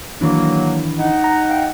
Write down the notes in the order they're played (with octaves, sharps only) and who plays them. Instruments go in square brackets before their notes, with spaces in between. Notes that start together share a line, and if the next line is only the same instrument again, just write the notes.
[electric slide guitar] D#3 E3 D4 [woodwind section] F#3 A#3
[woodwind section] D#4 F#5
[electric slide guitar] A#5
F5 G5